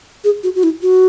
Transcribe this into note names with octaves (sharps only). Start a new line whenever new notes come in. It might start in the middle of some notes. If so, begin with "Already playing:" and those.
G#4
F#4
F#4
E4
F#4